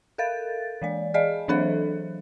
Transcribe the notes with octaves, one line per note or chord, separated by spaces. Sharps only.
A4 A#4 F5 A6
E3 G#3 D5
G#4 D5 D#5 F5
E3 F#3 D4 A4 C5 E5